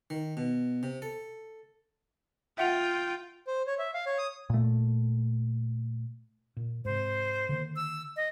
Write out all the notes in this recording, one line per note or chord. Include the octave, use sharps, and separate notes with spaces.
D#3
B2
C3
A4
F4 E5 F#5 G5 F7
C5
C#5
E5
F5
C#5
D#6
A#2 A3
A#2
G#2 C3 C5
D3 D#3 A#3
E6
D#5